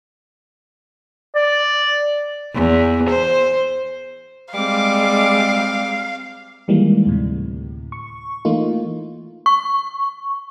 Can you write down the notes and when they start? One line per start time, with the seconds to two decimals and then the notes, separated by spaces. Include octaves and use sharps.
1.35 D5
2.54 E2
3.09 C5
4.54 G3 G#3 C4 F5 D6
6.68 D#3 E3 G3 G#3 A#3
7.07 D2 A2 C3
7.92 C#6
8.45 E3 A3 A#3 D#4 F4
9.46 C#6